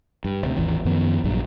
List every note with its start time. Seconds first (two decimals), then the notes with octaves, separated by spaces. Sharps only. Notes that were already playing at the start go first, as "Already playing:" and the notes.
0.25 G2
0.43 D2 C3
0.56 G#1 D#2 E3
0.85 F#2 D#3 F3 B3
1.24 A#1 G2 F#3